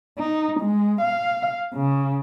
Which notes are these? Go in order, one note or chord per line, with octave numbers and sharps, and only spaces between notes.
D#4
G#3
F5
C#3